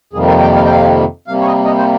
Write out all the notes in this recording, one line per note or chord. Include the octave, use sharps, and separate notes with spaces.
F2 C3 D#3 G3 A#3 G#4
A#4
G5
F5
G5
F5
C3 G3 A#3 F5
C#5
D#5
D#5
C5